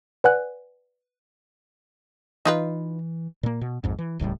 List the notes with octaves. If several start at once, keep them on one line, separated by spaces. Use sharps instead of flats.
B4 D5 F#5 G#5 F#6
E3 D#4 F4 B4
A#2 A#3
B2
A#1 F2 G#2
E3
D#1 C#2 A2 G3